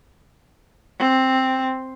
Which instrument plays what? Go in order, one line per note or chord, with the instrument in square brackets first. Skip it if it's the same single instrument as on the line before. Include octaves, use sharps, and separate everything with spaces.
[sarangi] C4